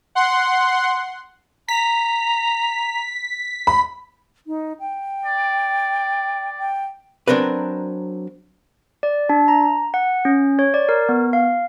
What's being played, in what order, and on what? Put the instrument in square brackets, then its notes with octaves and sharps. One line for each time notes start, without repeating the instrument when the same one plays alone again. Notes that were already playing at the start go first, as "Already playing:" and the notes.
[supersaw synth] F#5 C6
[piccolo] A#5 [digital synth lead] B6
[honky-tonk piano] B5
[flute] D#4
G5
[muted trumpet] D5
[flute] G5
[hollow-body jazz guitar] F#3 C4 D4 A#4 B4
[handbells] D5
D4
A#5
F#5
C#4
C#5
D5
A#4
B3
F5